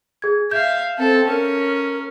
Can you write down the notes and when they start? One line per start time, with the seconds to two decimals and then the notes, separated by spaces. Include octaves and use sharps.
0.22 G#4 G#6
0.51 E5 F5 G6
0.99 C4 A4
1.28 C#4 A#4